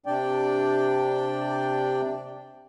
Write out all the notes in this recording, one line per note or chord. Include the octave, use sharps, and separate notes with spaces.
C3 D4 D5 G5